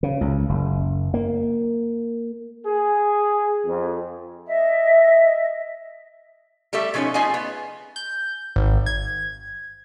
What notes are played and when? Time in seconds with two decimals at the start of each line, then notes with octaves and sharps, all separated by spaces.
0.03 C#3
0.21 C#2
0.49 F#1
1.14 A#3
2.66 G#4
3.66 F2
4.47 D#5 E5
6.73 G3 A3 G4 A4 E5
6.94 B2 F3 C#4 D#4 C#5
7.14 A3 F4 G#4 D#5 F5 G#5
7.34 B3
7.96 G6
8.56 G#1
8.86 G#6